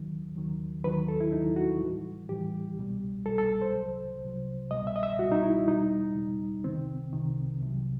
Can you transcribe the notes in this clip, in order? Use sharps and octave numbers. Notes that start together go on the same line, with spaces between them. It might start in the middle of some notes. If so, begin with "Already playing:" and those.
Already playing: D#2 D#3 F#3
D#2 D#3 F#3
D#2 D#3 F#3 B4
A4
E4
D#2 D#3 F#3 D#4
F#4
A2 E3 G3
A2 E3 G3 G4
C2 B2 G3
C2 B2 G3 A4
A4
C5
C2 C3 F#3
C2 C3 F#3
C2 B2 G3 D#5
E5
D#5
E5
C2 B2 G3 F#4
D#4
E4
E2 B2 G3 D#4
E2 B2 G3
C2 C3 D#3 C4
C2 C3 D#3
C2 C3 F#3